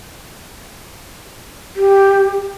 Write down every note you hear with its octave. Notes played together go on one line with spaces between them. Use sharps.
G4